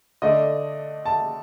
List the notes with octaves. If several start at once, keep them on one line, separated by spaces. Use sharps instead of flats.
D3 A3 D4 D#5
A5